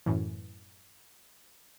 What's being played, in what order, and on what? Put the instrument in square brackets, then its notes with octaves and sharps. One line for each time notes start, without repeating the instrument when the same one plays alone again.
[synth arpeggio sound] F#2 A2 E3